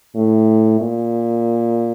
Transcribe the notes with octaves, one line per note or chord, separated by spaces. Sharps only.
A2
A#2